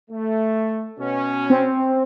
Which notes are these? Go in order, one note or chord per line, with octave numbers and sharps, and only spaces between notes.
A3
B2 C#4
C4